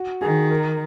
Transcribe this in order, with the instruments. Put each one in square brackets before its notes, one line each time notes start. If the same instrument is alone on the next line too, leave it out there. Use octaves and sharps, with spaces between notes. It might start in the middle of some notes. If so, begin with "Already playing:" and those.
Already playing: [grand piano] F#4
[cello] D#3 [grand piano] G#4
[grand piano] A#4